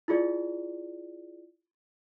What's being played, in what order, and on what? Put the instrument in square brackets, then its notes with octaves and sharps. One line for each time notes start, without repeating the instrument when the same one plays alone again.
[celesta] E4 F4 G#4 D5